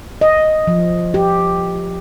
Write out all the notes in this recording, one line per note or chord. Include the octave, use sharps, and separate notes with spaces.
D#5
F3
G4